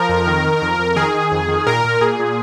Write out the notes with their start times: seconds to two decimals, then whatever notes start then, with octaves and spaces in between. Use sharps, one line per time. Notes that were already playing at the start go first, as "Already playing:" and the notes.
Already playing: F3 A#4
0.09 F2
0.27 D#3
0.44 D#3
0.62 F2
0.78 F2
0.96 D#3 G#4
1.14 D#3
1.32 F2
1.49 D#3
1.66 A#2 A#4
1.85 A#2
2.01 A#2 G#4
2.20 A#2